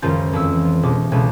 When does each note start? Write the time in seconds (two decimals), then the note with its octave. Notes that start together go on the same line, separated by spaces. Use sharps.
0.02 C#2 F#2 D#3 F3 F4 G6
0.33 F2 E3 E6
0.65 F4
0.83 E1 D6
1.11 E1 C#2 B2 A4 B4 G#6